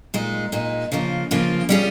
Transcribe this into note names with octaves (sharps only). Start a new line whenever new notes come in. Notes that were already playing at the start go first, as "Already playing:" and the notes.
A#2 G#3 D#4
A#2 G#3 D#4
C#3 F3 A#3 F4
C#3 F3 A#3 F4
G3 C#4 F4 G#4